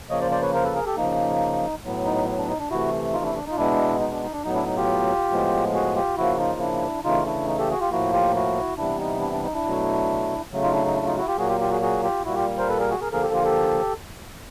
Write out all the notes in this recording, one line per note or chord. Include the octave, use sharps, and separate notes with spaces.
C#3 F3 A#3 C#5 D#5
C5 D5
C5 D5
B4 C#5
A#4 C5
A4 B4
G#4 A#4
G4 A4
C#3 F3 A#3 D#4
A2 F#3 B3
D#4
D4
D#4
D4
C3 E3 A3 E4 F#4
D#4 F4
D4 E4
D4
D#4 F4
B2 G#3 B3 D4 E4
D#4
D4
D#4
D4
A2 F#3 B3 D#4
D4 E4
D#4
F4 G4
A2 F3 G#3 B3
F#4 G#4
F4 G4
C#3 F3 A#3 E4 F#4
D#4 F4
D4 E4
C#3 E3 A3 D#4 F4
D4 E4
D#4
G4 A4
F#4 G#4
F4 G4
A2 F3 A#3 E4 F#4
F4 G4
E4 F#4
C3 E3 G3 B3 D4 E4
D#4
D4 E4
D4
D#4
D4 E4
B2 F#3 A3
C#3 F#3 A3
D#4 F4
D4 E4
D#4
D4 E4
D#4 F4
E4 F#4
F4 G4
A#2 F#3 A#3 F#4 G#4
F4 G4
F4 G4
F#4 G#4
F#4 G#4
F4 G4
A#2 G3 A#3 E4 F#4
F4 G4
A#4 C5
A4 B4
G#4 A#4
F#4 G#4
G#4 A#4
D3 F3 A#3 G#4 A#4
G4 A4
F4 G4
G4 A4